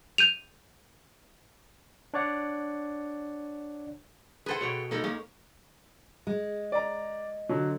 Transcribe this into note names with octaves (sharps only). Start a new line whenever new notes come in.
G6 D#7 F7
D4 C#5 D5 F#5
G#4 A4 B4 C5 F#5
B2 C#5 G5
G#3 A#3 D#4 A4 A#4
G#3 A#3 C#4
G#3
D5 A#5
D3 F#3